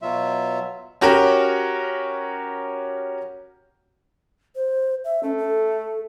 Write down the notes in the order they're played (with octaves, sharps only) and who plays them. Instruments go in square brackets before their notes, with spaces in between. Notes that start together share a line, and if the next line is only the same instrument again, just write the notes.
[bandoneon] B2 F#3 F4 E5
[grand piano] C#4 F#4 G4 A#4
[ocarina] C5
E5
[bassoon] A3 [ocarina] C#4
[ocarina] A4